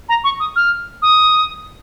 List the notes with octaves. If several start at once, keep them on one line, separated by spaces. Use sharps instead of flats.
A#5
C#6
D#6
F6
D#6